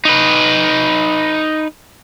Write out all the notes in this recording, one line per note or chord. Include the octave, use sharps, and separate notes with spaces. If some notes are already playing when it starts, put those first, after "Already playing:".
D#4 B4